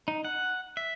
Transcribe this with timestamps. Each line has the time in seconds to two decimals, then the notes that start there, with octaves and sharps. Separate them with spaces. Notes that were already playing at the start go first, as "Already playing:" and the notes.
0.08 D#4
0.25 F#5
0.77 E5